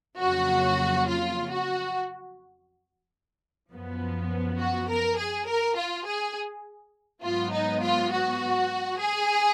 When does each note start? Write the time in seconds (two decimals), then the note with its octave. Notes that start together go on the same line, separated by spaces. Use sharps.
0.20 F2 C#3 F#3 A#3 F#4
1.08 F4
1.52 F#4
3.72 F#2 F3 B3
4.60 F#4
4.89 A#4
5.18 G#4
5.48 A#4
5.77 F4
6.06 G#4
7.23 G#2 F#3 B3 F4
7.52 D#4
7.82 F4
8.11 F#4
9.00 G#4